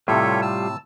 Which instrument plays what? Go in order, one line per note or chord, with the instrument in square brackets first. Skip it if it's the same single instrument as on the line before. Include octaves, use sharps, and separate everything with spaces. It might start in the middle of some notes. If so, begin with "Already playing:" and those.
[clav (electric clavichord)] A2 C3 [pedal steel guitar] G3 F4 [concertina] A4 C#5 E5
[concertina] A5 E6